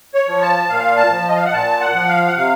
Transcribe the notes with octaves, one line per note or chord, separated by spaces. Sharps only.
C#5
F3
A5
A#2 F5
A5
F3
D#5
F5
F#5
A#2 A5
F#5
F3
F5
F#5
C3 F5